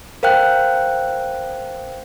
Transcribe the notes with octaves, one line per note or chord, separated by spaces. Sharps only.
A#4 C5 F5 G5 F#6